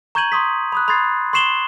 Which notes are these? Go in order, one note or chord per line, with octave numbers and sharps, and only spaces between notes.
A#5 C#6 G6 G#6 D#7 F#7
C6 C#6 D#6 B6
B5 D#6 F#6
B5 C6 D#6 G#6 A6 C7
C6 C#6 C7 E7 F#7 G7